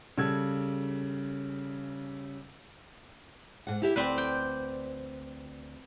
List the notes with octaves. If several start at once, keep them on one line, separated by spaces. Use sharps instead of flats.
C#3 G3 A4 E6 G#6
G#2 F#5
E4 G4 E5
D2 C4 B4 D5
G5